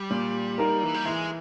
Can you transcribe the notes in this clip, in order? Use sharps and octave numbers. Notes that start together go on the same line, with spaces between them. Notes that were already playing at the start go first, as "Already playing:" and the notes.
Already playing: G3
A#2
A#3 D#4 A#4
E3
G3
E3 G#3